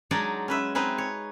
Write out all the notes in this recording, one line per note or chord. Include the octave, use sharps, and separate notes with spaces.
F#3 G#3 D4 D#4 G#4 D5
C#4 B4 E5
C4 D#4 G#4 B4
C#5